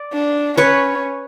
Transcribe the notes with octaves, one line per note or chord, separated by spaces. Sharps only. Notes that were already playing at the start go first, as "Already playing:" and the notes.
Already playing: D5
D4
C#4 B4 C#5